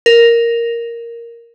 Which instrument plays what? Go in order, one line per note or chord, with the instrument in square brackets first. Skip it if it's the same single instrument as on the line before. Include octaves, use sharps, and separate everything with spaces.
[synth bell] A#4